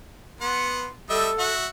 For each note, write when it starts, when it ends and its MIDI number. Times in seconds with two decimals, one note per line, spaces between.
0.41 0.86 59
0.41 0.86 78
0.41 0.86 84
1.10 1.30 55
1.10 1.50 69
1.10 1.30 75
1.10 1.30 76
1.39 1.67 66
1.39 1.67 76
1.39 1.67 78